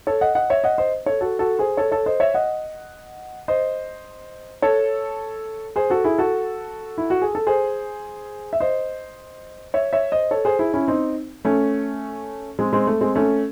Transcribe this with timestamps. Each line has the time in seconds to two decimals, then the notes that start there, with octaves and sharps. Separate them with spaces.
0.07 A4 C#5
0.21 D#5 F#5
0.35 D#5 F#5
0.50 C#5 E5
0.64 D#5 F#5
0.78 C5 D#5
1.06 A4 C#5
1.21 F#4 A4
1.39 F#4 A4
1.59 G#4 C5
1.77 A4 C#5
1.92 A4 C#5
2.06 C5 D#5
2.20 C#5 E5
2.34 D#5 F#5
3.48 C5 D#5
4.62 A4 C#5
5.76 G#4 C5
5.90 F#4 A4
6.04 E4 G#4
6.18 F#4 A4
6.98 E4
7.10 F#4
7.22 G#4
7.35 A4
7.47 G#4 C5
8.53 E5
8.60 C5 D#5
9.74 C#5 E5
9.93 C#5 E5
10.12 C5 D#5
10.31 A4 C#5
10.45 G#4 C5
10.59 E4 G#4
10.73 C#4 E4
10.88 C4 D#4
11.45 A3 C#4
12.59 G#3 C4
12.73 G#3 C4
12.87 A3
13.01 G#3 C4
13.16 A3 C#4